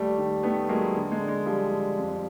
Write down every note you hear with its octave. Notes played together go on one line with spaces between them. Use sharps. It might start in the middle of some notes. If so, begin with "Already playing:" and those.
Already playing: D#2 G3 A3
D#3
D#3 A3 B3
F#3 G#3 A#3
D3
G#3
D3
G#3
F3 G3
F3
F2